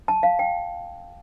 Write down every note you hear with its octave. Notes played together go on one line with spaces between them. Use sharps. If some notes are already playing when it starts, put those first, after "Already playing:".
A5
F5
G5